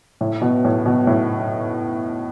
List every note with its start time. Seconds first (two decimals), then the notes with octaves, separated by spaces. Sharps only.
0.21 A2
0.41 B2
0.64 A2
0.86 B2
1.07 A2